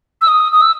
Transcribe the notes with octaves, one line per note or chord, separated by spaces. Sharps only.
E6
D#6
D#6
E6